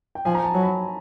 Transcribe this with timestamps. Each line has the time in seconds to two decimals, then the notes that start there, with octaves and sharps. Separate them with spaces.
0.15 G5
0.25 F3 G#5
0.35 A#5
0.44 A5
0.54 F#3
0.63 B5